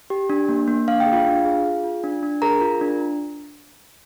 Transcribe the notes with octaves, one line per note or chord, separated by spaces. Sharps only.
G4
D4
A#3
A#3
D4 F5
G5
G#4
F4 F5
D4
G#4
G#4
F4
D4
D4
G#4 A#4 A#5
F4
D4